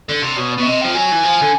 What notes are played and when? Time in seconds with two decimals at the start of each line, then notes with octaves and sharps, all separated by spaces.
0.09 D3 D5
0.22 C3
0.37 B2 C#5
0.51 D5
0.58 B2
0.62 E5
0.66 C3 D#5
0.81 F3 G5
0.94 F#3 G#5
1.12 E3
1.24 F3
1.42 D3